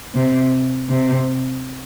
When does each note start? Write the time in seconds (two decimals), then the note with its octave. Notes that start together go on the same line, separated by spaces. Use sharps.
0.14 C3
0.89 C3